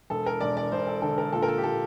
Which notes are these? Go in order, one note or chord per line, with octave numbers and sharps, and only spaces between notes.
E1 A4
A#4
E1 D5
D5
E1 C5
A4
D3 A4
A#4
A#2 A4
A#4
A4
G4
A#2 A4